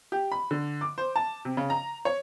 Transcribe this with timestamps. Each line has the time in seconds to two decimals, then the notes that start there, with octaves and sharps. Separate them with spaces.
0.12 G4
0.32 B5
0.51 D3
0.81 D6
0.98 C5
1.16 A5
1.45 C3
1.57 C#3
1.70 A#5
2.05 C#5